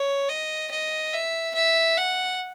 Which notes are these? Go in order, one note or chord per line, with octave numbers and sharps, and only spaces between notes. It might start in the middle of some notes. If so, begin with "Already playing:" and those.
Already playing: C#5
D#5
D#5
E5
E5
F#5